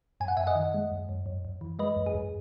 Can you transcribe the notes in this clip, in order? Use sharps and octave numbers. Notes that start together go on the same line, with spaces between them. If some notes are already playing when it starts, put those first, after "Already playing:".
F#2 G#5
F#5
F#2 E5 G#5
D#5 F#5
D#3
G#3
F#2
F#2
F#2
F#2
E3
G#3 B4 D#5
F#2
G#4
F#2